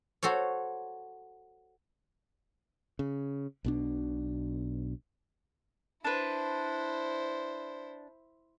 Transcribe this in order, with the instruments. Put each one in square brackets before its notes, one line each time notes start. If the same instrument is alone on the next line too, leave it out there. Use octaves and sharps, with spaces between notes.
[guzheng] F#4 A4 C5 C#5
[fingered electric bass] C#3
B1 B2 D4
[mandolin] D4 B4 [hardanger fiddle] E4 C5